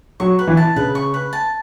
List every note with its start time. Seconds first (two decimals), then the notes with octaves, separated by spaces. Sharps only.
0.20 F#3 C#6
0.39 B4
0.48 E3
0.57 A5
0.76 C#3 B4
0.95 C#6
1.14 B4
1.33 A5